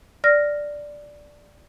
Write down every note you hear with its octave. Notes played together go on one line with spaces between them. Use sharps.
D5 F6 A#6